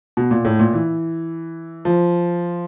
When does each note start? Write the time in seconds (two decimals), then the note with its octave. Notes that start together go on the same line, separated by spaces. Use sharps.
0.17 B2
0.31 A#2
0.45 A2
0.59 A#2
0.73 E3
1.85 F3